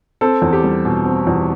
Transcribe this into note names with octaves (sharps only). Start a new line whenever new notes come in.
C4 A4
E2
G4
G3
B2
C4
E2